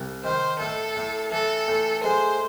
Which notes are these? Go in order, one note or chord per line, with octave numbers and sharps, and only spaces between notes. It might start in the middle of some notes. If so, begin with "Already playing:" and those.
Already playing: C2
D#3 C5
A2 A4
A2
E3 A4
A2
G#3 C5